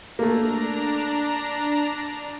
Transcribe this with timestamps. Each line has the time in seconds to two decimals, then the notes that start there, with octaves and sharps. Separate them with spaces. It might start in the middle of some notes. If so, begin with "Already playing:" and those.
0.19 A3 A#3 D4 A#5